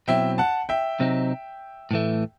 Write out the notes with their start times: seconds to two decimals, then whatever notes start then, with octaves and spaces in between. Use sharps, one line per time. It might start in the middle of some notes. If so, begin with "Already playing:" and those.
0.08 B2 F#3 C4 E4 E5 G5
0.38 F#5 A5
0.69 E5 G5
1.00 C3 F#3 C4 D#4
1.91 A2 E3 A3